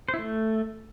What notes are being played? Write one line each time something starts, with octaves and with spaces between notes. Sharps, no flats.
C5
E4
A3